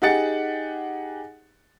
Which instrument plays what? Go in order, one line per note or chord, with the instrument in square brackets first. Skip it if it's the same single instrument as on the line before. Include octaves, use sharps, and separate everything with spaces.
[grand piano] D#4 G4 G#4 F#5 A6 C#7